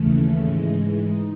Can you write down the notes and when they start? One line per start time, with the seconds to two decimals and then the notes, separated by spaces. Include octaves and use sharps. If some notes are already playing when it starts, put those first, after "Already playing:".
Already playing: D#2 C#3 E3 A3
0.41 G#2 E3 G#3
1.04 D#4